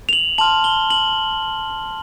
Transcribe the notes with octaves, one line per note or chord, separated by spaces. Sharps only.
F7
F#7
A5 C6 F6 F#7
G7
F#7